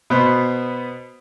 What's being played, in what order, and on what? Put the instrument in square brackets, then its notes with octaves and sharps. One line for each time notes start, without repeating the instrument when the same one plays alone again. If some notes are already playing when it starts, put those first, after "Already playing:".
[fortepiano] B2 B3 C5